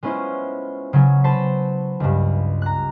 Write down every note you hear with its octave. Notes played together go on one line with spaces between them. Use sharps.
G#3 B3 C#4 E4 F4 C5
C#3 F#3 C#4
B4 C5 A5 B5
C#2 G2
A#5 F#6